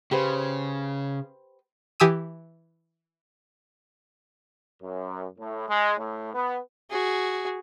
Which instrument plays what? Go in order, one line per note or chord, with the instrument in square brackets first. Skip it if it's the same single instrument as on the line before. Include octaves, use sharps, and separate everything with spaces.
[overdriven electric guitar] C#3 [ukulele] G4 B4 C5
[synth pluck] E3 G4 G#5 D#6 E6 D#7
[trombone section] F#2
A2
G#3
A2
B3
[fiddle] F#4 G#4